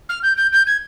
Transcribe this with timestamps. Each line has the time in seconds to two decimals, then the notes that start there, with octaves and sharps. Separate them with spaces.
0.09 F6
0.23 G6
0.37 G6
0.53 G6
0.67 G#6